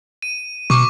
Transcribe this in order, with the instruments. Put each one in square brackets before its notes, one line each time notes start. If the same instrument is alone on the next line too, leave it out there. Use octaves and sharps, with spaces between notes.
[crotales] D#7
[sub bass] B2 [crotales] C#6 D6